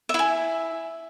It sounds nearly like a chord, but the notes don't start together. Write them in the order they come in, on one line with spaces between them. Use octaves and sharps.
E5 E4 G#5